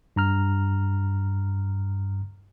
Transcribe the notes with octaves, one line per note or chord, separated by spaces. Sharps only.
G2 A#5 F6